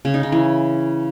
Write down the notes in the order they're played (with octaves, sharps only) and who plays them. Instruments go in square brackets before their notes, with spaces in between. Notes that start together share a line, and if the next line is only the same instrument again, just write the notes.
[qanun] C#3
D#4
C#3
E3